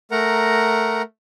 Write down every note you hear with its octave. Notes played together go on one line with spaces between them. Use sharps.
A3 A#4 F#5 A#5